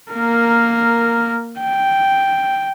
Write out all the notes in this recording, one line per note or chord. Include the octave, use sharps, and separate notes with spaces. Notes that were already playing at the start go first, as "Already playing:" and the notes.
A#3 A#4
G5